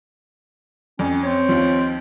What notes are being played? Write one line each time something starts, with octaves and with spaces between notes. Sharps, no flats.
F2 C#4
C4 C#5
D#2 F3